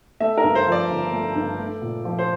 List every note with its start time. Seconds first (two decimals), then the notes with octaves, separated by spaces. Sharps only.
0.20 A3 E5
0.38 A#4
0.44 G2
0.55 C5
0.67 F3 D5
0.90 G1
1.13 A3
1.36 G2
1.59 A3
1.82 A#2
2.05 F3
2.19 C5